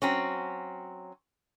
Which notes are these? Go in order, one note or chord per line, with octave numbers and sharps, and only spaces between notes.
F#3 C4 C#4